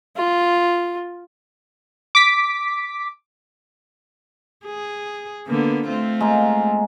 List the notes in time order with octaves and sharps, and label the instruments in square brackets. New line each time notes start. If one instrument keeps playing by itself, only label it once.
[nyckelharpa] F4
[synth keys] D6 B6
[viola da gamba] G#4
D3 A#3 B3
A3 C4 F4
[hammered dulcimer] G#3 A#3